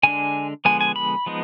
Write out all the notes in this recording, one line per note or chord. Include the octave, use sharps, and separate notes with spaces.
D3 G#3 D4 G#5
D3 F3 G#3 B3 G#5
G#5
B5
F3 G#3 B3 D#4